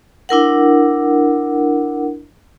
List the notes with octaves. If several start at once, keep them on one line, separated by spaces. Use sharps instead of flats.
D4 E4 A#4 F#5